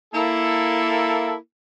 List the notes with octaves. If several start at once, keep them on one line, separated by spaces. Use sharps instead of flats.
A#3 E4 A4